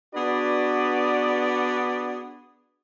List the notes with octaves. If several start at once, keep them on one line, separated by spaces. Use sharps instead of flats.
B3 D4 F#4 G#4 B4 D5